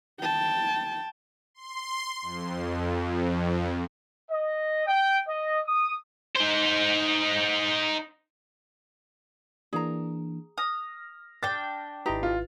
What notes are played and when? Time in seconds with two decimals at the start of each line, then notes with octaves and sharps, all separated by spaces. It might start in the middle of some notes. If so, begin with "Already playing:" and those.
0.20 G5 A5
1.55 C6
2.22 F2
4.31 D#5
4.87 G5
5.28 D#5
5.65 D#6
6.35 D#4 C5
9.73 E3 A#3 D4 G#4 A#5
10.58 D#6 F6 A#6
11.43 D4 G5 A6
12.06 G#1 D#4 E4 G4 B4 A#5
12.23 F4